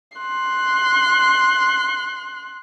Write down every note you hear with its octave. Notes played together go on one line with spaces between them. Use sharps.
C6 F#6